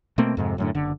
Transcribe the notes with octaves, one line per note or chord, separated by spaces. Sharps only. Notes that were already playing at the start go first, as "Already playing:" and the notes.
B2 A3 A#3 C4
F2 G#2 C3
F#2 A2 D3
F#1 D3